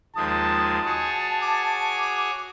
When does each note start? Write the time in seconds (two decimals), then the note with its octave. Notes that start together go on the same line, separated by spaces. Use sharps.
0.16 D#2 F3 G#3 A5 D#6
0.85 F#4 G#4 C#5
1.41 D6